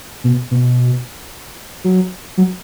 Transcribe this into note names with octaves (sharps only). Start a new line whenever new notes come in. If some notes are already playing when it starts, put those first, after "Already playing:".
B2
B2
F#3
F#3